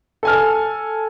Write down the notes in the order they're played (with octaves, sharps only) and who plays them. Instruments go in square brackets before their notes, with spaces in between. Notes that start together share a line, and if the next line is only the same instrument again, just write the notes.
[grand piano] A4 G#5 F6